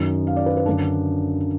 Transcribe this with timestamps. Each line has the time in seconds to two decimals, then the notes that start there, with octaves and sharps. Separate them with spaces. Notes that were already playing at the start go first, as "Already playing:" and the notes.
Already playing: F#2 D#3
0.27 F5
0.36 D5
0.46 B4
0.57 B4
0.66 F#2 D3 D4